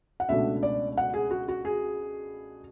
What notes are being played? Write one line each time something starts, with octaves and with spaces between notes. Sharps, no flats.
F#5
C#2 B2 A3 D4 E5
D5
F#5
G#4
F#4
F#4
G#4